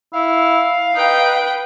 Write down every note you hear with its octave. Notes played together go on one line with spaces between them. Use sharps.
E4 F5
D#4 B4 G5